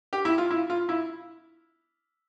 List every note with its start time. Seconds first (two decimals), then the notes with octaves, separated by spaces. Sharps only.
0.13 G4
0.25 E4
0.38 F4
0.51 E4
0.70 F4
0.89 E4